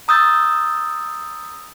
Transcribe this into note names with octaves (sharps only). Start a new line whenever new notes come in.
A#5 D#6 E6 G6 A6